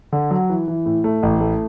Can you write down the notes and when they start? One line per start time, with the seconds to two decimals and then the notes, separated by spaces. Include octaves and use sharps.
0.12 D3
0.31 F#3
0.50 E3
0.68 E3
0.86 A2
1.04 A3
1.23 A1
1.41 A3